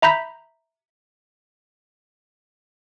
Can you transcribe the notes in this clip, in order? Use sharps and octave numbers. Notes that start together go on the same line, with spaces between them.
E5 A#5 B5 G6 B6